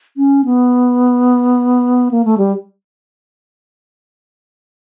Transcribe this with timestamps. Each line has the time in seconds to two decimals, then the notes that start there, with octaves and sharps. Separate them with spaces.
0.17 C#4
0.45 B3
2.11 A#3
2.25 A3
2.38 G3